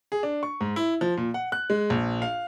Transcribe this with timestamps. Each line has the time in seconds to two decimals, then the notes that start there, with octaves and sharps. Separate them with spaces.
0.12 G#4
0.23 D4
0.43 C#6
0.61 G#2
0.76 E4
1.01 F3
1.17 A#2
1.34 F#5
1.52 F#6
1.70 G#3
1.90 A#1
2.22 F5